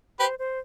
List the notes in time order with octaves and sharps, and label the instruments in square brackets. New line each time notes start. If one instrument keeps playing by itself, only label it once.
[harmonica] G4 B4 [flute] C5
[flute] C5